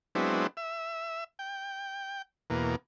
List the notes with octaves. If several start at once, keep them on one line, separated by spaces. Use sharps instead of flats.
F#3 G#3 B3 C4 D4 E4
E5
G5
E2 B2 A#3